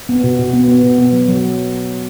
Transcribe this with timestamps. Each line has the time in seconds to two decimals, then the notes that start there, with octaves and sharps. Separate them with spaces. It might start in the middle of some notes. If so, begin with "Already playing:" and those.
0.09 B3
0.24 B2
0.39 B2
0.54 B3
0.68 B3
0.83 B2
0.98 B3
1.12 F#3
1.28 F#3